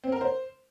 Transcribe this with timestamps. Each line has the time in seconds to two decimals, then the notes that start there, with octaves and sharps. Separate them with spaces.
0.04 C4
0.12 A#4
0.21 C5